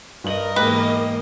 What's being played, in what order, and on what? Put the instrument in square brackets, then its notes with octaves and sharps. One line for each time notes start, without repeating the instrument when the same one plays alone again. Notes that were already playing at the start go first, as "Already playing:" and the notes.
[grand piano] G2 F#7 [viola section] A#4 D#5
[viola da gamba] E2 G#2 A#3 [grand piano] G#3 G4 [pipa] B4